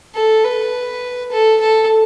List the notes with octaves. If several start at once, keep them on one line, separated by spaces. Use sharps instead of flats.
A4
B4
A4
A4